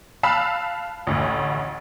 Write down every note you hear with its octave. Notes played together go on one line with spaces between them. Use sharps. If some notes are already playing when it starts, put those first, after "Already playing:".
F5 A5 B5 E6 F#6
A1 D2 A2